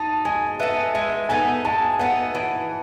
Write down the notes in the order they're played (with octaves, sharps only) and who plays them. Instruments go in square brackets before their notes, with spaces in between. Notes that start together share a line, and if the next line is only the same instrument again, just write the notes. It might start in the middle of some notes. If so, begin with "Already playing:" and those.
Already playing: [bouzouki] D#4 [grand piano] A5
[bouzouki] G#3 [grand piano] G#5
[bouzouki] B3 D#4 A4 [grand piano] E5
[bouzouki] G#3 [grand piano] E5
[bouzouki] B3 D#4 A4 [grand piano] G#5
[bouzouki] G#3 [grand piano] A5
[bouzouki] B3 D#4 A4 [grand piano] F#5
[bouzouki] E3